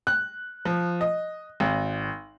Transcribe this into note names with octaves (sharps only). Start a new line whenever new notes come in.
F#6
F3
D#5
G#1